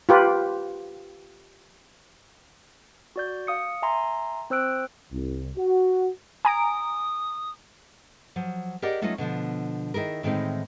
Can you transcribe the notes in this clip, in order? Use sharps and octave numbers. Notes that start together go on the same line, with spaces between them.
F4 G4 B4
F#4 D5 G6
F5 D#6 C#7
E5 G#5 A#5 C6
C4 C5 E6 F#6 D7
C2
F#4
G#5 A#5 D#6 D7
F3 F#3
G4 G#4 A#4 D5 D#5 F#5
F#3 A3 C#4 D#4 F4 D#5
B2 D3 E3 F3
D#3 E4 G#4 A#4
A2 D#3 E3 G#3 C4 D#4